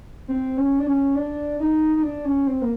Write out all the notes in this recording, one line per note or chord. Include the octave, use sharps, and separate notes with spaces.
C4
C#4
D4
C#4
D4
D#4
D#4
D4
C#4
C4
A#3